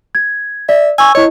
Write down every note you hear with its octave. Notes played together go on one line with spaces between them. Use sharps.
G#6
D5 E5
G#5 C#6 E6
E4 C#5 D#5